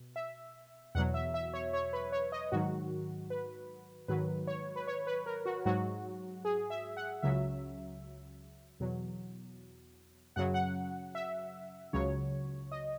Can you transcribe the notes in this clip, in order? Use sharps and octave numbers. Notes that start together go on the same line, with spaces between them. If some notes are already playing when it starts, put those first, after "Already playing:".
Already playing: B2
E5
E2 B2 F#3 F#5
E5
E5
C#5
C#5
B4
C#5
D#5
G#2 D#3 F#3 F#4
B4
G#2 D#3 F#3 B4
C#5
B4
C#5
B4
A#4
F#4
G#2 F#3 F#4
G#4
E5
F#5
C#2 C#3 F#3 E5
E2 B2 F#3
F#2 C#3 F#3 F#5
F#5
E5
C#2 C#3 F#3 C#5
D#5